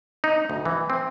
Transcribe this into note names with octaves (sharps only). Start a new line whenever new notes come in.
D#4
D2
E3
C4